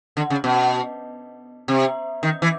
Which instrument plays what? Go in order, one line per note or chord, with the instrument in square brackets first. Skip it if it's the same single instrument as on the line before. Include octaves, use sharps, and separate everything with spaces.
[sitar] D3
C#3
B2
C3
D#3
E3